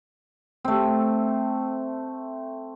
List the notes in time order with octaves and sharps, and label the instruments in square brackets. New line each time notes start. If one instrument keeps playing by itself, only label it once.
[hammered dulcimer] A3 C4